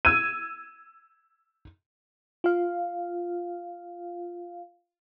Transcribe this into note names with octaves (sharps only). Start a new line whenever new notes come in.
E6 G#6 D#7
F4 F5